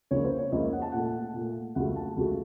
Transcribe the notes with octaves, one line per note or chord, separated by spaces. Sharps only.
C#2 C#3 F3 A#3 C#5
C5
C#5
C#2 C#3 F3 A#3 D#5
F#5
A5
A#2 A3 F#5
A#2 A3
C#2 C#3 F#3 A3 F#5
A5
C#2 C#3 F#3 A3